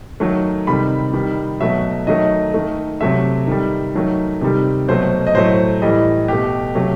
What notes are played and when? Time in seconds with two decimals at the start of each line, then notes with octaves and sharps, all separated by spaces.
0.20 D#3 F#3 A3
0.67 C3 D#3 G3 B5
1.13 D#3 G3
1.61 B2 F#3 A3 E5
2.07 D#3 F#3 A3 D#5
2.54 D#3 A3
3.01 C3 F#3 A3 E5
3.47 D#3 G3
3.95 D#3 F#3 A3
4.41 C3 D#3 G3
4.88 B2 F#3 A3 C5
5.27 D#5
5.34 A2 F#3 A3 C5
5.82 A2 E3 G3 D#5
6.28 B2 A3 G4
6.75 C3 F#3 A3